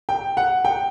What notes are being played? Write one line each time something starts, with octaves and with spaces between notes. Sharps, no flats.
G5
F#5
G5